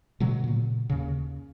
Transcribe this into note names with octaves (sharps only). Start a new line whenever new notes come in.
B2 D3 F#3 G#3
A#2 C#3
D#2 C#3